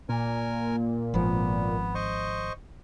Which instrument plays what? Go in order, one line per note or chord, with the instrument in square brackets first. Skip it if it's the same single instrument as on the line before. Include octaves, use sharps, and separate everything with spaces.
[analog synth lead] A#2 [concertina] A#4 G#5
[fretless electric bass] G#1 F3 [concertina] B3
[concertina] C5 D#5 C#6